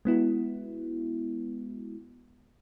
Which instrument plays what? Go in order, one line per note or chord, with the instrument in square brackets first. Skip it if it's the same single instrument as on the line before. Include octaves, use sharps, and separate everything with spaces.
[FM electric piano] G#3 B3 E4 F#4